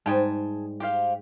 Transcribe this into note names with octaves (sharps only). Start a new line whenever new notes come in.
G#2 G3 G#4 G5 A5
G4 C5 F5